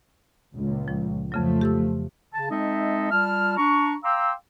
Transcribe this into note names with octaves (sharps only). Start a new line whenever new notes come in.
C#2 A#2
F3
F2 C#3 F3 F#3 A3
G4 A4 E6
C#3 A5
G#3 C4 D#4 A4 D#5 E5
G3 F4 A5 F6
D4 A#5 C#6
F5 G5 A#5 C6 D6 E6